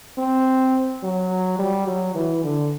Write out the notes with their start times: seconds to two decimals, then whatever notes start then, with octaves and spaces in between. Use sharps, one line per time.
0.18 C4
1.04 F#3
1.59 G3
1.87 F#3
2.15 E3
2.44 D3